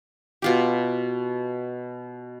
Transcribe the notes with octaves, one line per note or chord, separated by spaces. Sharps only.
B2 F4 G4